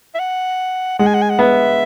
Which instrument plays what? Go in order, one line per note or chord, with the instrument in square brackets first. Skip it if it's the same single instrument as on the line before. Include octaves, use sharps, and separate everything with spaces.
[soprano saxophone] E5
F#5
[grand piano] G#3 [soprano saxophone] F#5
[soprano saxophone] G#5
F#5
G#5
F#5
[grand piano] B3 [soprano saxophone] E5